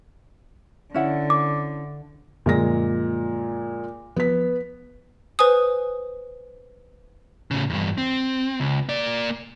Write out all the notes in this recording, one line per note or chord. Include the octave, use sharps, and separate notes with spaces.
D3 C#4 E4 F#5
D6
F#2 A#2 D3 F3 G#3 A#6
F3 B3 B6
B4 C5 G#5 D#6
A2 C#3
E2 G2
C4
C#2
A#3 D5